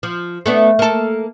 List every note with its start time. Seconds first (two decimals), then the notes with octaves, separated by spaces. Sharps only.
0.03 F3
0.46 A3 B3 D4
0.79 A#3 A4